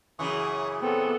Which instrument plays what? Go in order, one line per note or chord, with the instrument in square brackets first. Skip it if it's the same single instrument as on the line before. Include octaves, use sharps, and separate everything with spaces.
[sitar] F#2 C#3 E3 [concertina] C#6 D#6
[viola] B3 A4 [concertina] C4